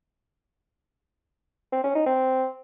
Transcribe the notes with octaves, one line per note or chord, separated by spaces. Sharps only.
C4
C#4
D#4
C4